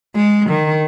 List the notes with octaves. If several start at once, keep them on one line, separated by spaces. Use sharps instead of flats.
G#3
D#3